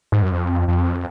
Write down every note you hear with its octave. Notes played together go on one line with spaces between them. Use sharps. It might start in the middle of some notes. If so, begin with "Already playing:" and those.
G#2
F#2
F2
F2